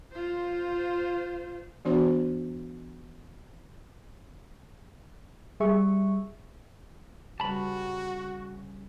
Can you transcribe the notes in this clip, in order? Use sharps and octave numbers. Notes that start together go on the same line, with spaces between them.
F4 C5
E3 B3 D4 F#4 C5
G3 G#4 E5 C#6
C#3 G3 F#4 B4 A5 B5